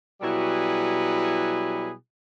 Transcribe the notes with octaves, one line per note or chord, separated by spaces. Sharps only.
B2 F#3 G3 E4 G#4 B4